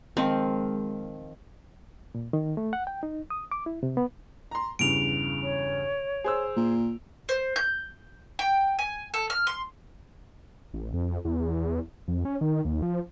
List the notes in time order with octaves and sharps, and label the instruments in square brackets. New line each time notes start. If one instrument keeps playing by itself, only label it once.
[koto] D#3 F3 [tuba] G#3 [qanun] C4
[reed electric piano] A#2
D#3
A3
F#5
G5
D#4
D#6
D6
E4
C3
B3
[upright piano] A#5 C6
[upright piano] E2 G2 C#3 [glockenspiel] D7 F7
[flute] C#5
[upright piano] G#4 C5 E6
[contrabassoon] A#2
[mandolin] C5
G6
G5
G#5
A4
F6
C6
[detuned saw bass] A1
F2
E2
F2
C#4
D#3
D#2
F3